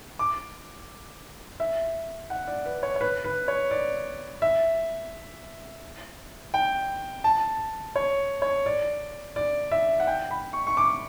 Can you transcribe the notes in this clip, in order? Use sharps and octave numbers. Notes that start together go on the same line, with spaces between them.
D6
E5
F#5
D5
B4
C#5
C#5
B4
B4
C#5
D5
E5
G5
A5
C#5
C#5
D5
D5
E5
F#5
G5
B5
C#6
C#6
D6